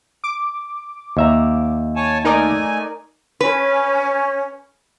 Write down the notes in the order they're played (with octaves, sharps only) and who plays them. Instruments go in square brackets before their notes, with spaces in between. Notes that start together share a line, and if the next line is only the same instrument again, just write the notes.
[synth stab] D6
[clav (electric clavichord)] D#2 E5 A#5
[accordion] C#5 G#5 A5
[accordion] A3 G#5 [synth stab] D#4 A#4 D5
[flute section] C#4 [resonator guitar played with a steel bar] B4